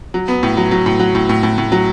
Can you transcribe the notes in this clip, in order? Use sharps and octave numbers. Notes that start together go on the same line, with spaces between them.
F#3
B3
A2
F#3
F#3
A2
F#3
A2
A2
A2
A2
F#3